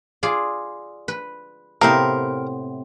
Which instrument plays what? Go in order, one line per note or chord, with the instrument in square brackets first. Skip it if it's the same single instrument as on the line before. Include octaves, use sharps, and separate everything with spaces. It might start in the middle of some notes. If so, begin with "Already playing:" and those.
[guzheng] F4 G#4 D5
B4
[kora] A2 C3 G4 [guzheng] B3 C4 F5 [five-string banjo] A#4